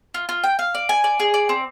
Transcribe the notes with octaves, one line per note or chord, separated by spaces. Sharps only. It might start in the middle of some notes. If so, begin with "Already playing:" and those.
F4
F4
G5
F5
D5
G#5
D5
G#4
D5
C4